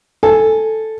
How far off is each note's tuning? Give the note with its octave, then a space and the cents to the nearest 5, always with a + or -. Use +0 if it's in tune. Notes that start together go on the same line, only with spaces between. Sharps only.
A4 +0 G#5 +0